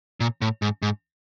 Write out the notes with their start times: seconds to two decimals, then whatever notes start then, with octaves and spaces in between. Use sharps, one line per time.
0.20 A#2
0.42 A2
0.62 G#2
0.82 G#2